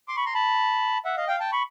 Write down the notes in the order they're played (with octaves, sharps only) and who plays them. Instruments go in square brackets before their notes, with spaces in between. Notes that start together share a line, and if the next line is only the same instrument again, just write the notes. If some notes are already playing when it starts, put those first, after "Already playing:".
[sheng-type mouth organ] C6 D6
B5 C#6
A#5 C6
A5 B5
E5 F#5
D#5 F5
F5 G5
G5 A5
B5 C#6